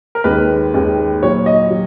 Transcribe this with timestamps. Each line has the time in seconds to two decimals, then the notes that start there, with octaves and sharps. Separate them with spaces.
0.15 A#4
0.24 D#2 D#3 G#3 B4
0.74 D#2 D#3 G#3
1.22 A#2 F#3 C#5
1.46 D#5
1.70 F#3